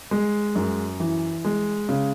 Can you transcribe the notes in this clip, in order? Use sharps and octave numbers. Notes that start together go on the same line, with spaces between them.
G#3
F#2
E3
G#3
C#3